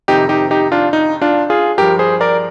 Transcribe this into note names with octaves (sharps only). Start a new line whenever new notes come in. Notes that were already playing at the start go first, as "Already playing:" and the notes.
F2 C3 D#3 D#4 G4
D#4 G4
D#4 G4
D4 F4
D#4
D4 F4
F4 G#4
G2 F3 G4 A#4
G#4 C5
A#4 D5